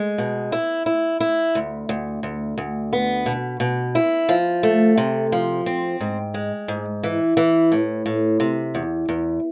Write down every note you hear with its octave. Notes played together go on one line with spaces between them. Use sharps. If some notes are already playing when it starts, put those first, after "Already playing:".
Already playing: G#3
B2
E4
E4
E4
D2
D2
D2
D2
B3
B2
B2
E4
F3
A3
C3
F3
C4
G#2
G#3
G#2
E3
E3
A2
A2
C3
E2
E2